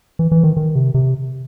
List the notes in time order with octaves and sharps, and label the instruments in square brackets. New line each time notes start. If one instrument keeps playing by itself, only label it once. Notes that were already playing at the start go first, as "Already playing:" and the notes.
[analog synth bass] E3
E3
D#3
D#3
C3
C3